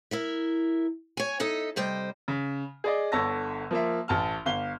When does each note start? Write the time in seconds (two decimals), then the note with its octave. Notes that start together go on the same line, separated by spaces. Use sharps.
0.11 E4 A#4 E5
1.17 C#5 G#5
1.40 D#4 A4 D#5 E5
1.76 C3 G3 C5 D#5 G5
2.28 C#3
2.84 G#4 D5 D#5
3.12 G1 D3 C#5 A5 E6 A#6
3.71 F3 A#3 E5
4.08 A1 A5 F6
4.46 G1 F5 G7